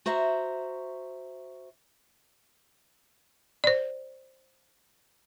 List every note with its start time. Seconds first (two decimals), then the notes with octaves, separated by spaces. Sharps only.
0.06 F#4 C5 E5 A#5
3.64 C5 D5